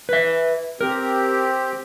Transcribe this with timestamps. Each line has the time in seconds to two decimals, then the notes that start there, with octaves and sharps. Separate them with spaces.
0.09 B4 E5
0.81 C4 G4 A#4